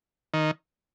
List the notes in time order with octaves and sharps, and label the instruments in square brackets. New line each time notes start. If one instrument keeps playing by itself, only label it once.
[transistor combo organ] D#3